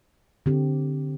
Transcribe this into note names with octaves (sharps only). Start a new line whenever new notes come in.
D3 C4 G4